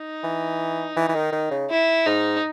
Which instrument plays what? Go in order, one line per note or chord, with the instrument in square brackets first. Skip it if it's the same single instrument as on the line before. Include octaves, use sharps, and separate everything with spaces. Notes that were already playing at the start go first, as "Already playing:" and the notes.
Already playing: [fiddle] D#4
[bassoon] E3
E3
E3
D#3
D#3
C#3
[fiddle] E4
[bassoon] G#2 [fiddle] D#4